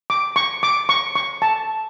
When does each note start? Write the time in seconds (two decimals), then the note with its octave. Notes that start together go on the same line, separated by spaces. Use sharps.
0.10 D6
0.36 C#6
0.63 D6
0.89 C#6
1.16 C#6
1.42 A5